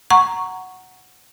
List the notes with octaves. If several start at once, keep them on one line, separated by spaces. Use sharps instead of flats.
F#5 A#5 C#6